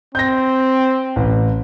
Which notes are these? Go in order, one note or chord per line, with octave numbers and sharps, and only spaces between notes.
C4 G6 A#6
A1